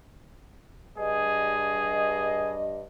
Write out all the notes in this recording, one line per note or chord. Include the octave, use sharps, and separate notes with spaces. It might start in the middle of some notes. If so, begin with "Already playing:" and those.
G2 G#4 D#5